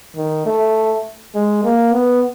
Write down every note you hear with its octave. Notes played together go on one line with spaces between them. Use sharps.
D#3
A3
G#3
A#3
B3